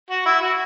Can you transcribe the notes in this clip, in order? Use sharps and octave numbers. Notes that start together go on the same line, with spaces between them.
F#4
E4
F#4